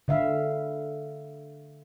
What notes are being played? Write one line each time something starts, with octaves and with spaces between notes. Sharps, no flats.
D3 E5 F5